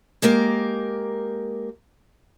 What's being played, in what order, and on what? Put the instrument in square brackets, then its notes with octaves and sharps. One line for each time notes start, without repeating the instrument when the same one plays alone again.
[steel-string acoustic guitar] G#3 A#3 G4 A#4